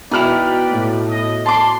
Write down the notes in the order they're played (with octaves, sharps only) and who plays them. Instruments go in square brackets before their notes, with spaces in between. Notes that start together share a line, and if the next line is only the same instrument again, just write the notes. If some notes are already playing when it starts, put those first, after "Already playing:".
[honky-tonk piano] B2 F6 F7 [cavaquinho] D#4 E4 [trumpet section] B4 D5 G5
[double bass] A2
[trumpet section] D#5
[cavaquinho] A5 D6 [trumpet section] C6